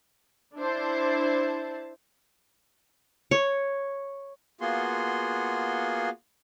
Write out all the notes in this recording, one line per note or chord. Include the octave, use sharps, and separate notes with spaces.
D4 E4 C5 A5
C#5
A#3 B3 F4 F#4 G#4 C6